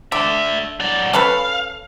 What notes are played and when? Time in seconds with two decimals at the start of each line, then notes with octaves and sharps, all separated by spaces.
0.12 D3 D5 E5
0.80 F#3 D5
1.13 C#4 A4 B4 F5